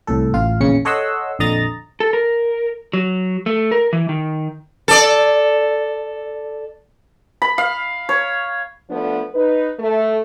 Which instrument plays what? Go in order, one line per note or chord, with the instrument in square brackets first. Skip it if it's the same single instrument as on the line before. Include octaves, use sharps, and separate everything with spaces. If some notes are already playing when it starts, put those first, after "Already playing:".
[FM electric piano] C2 A2 A4
A1 F4 F5
A#1 E2 C#3 C#4 C#7
A4 C#5 D#5 F#5 C6 E6
A#1 F2 D3 D#5 A#5 A6
[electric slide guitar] A4
A#4
F#3
A3
A#4
E3
D#3
[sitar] A4 D5
[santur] B5
F5
C#5
[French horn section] D3 F3 A3 B3 D4
D#4 B4
A3